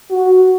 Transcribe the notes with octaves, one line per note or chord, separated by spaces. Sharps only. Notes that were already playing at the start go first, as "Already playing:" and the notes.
F#4